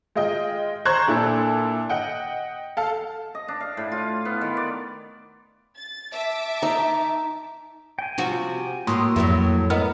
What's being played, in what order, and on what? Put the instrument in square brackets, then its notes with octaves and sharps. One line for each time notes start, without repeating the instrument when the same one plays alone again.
[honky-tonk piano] G#3 F4 D#5 G5
C5 A#5 C#6 F#6 G#6
A#2 D4 E4 A4
D#5 F#5 G5
A4 F5
[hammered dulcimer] D#5
D4
F5
A2
F4
B3
D#3
D5
[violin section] A6
E5 A5 D6
[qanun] D#4
[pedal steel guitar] G5 G#5
[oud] C3 F3 F#4
[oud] A2 [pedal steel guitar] A#3 F#4 [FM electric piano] C6 D#6
[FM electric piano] F2 [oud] A2 F#3
[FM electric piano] A3 A#4 D#5 [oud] B3 [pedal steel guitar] F6